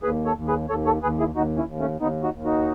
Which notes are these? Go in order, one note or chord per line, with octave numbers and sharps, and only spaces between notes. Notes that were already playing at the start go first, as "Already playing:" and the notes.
D#2 G#4 B4
A4 C#5
D#2
G#4 B4
D#2 A4 C#5
A4 C#5
D#2 G#4 B4
E4 G#4
D#2 D#4 F#4
C#4 E4
D#2
A3 C#4
D#2 B3 D#4
D#4 F#4
D#2
D#4 F#4